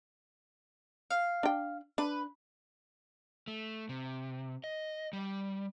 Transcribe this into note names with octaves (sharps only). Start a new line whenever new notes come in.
F5
D4 G5
D4 B4
A3
C3
D#5
G3